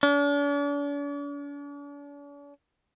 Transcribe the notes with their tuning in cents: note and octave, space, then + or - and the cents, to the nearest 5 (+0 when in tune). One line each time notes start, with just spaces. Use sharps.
D4 -45